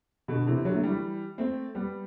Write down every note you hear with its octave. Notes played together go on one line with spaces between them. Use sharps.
B2 D3
C3 E3
D3 F#3
A3
E3 G3
A3 C4
G3 B3